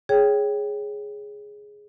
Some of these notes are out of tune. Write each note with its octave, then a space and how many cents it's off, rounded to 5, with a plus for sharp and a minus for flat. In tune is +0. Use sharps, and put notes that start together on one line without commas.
G#4 +0 C#5 +0 G5 +0